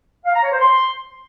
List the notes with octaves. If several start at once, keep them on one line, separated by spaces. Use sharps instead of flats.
F5
A#5
C#5
C5
C6